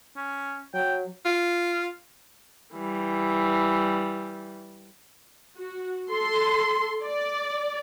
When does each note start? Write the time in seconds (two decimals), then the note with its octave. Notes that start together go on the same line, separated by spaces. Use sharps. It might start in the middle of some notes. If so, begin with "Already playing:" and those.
0.16 C#4
0.74 F#3 G5
1.25 F4
2.74 E3 G3
5.57 F#4
6.11 A4 C6
7.04 D5